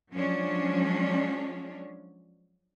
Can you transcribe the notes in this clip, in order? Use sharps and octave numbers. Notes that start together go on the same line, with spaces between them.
F3 F#3 G#3 C#4 D4